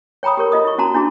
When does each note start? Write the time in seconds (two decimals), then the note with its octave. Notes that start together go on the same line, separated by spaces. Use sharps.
0.23 C#5 G5 A#5 B5 D#6
0.37 G4 A4 A#4 C#5
0.52 F4 D#5 D#6
0.65 E4 C#6
0.78 C#4 F#4 A5 A#5 C6
0.94 D4 E4 F#4 G#4